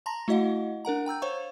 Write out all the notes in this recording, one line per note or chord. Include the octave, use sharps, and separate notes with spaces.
A5 A#5 C6 A#6
A3 E4 F#4 D#5 F5 F#5
D4 A#4 F#5 A#5
G5 A#5 E6 G6
C5 C#5 F5 C#6